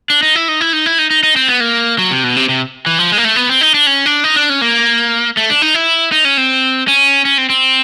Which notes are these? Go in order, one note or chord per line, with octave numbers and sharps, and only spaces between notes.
D4
D#4
E4
D#4
E4
D#4
E4
D#4
D#4
D#4
C4
B3
A#3
F#3
C3
B2
C3
C3
E3
F3
G#3
A#3
A3
B3
C4
D#4
D4
C#4
D4
D#4
D4
C#4
A#3
A3
D4
D#4
E4
D#4
C#4
C4
C#4
C#4
C4
C4